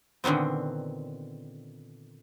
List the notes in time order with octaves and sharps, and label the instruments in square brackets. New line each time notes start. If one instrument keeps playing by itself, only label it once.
[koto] A#2 D3 D#3 B3 C4